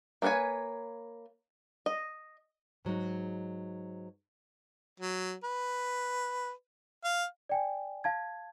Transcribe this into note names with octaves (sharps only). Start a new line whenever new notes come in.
A#3 G#4 B4 C#5 G#5
D#5
G#2 F#3 G#3 D#4
F#3
B4
F5
D5 G5 G#5
F5 A5 G#6